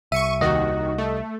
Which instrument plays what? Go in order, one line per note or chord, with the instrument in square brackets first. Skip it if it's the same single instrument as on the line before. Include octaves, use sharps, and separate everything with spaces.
[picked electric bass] C2 [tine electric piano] E5 [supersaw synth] C#6 C#7 D#7
[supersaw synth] D#2 D#3 F#4 [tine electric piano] D#5
[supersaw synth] A3